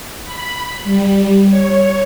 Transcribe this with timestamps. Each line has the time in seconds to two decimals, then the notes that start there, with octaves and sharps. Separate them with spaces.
0.24 B5
0.84 G3
1.50 C#5